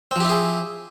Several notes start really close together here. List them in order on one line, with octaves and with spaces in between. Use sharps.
C4 F3 G4 E4 G#4